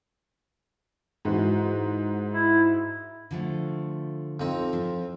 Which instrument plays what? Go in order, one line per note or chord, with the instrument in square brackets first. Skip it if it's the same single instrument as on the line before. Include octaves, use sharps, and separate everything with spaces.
[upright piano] G#2 E3 F#4
[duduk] E4
[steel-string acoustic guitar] D3 F3 A3
[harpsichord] F2 C4 [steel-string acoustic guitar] D#4
[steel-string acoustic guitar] F3